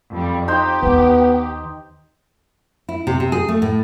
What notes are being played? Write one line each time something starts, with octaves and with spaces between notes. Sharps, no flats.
F2 G3
D#4 G4 C5 G5
D#2 D#3 B3
E4
C3
C3
G#4
A3
A2